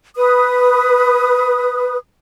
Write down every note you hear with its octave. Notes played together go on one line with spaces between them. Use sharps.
B4 D#6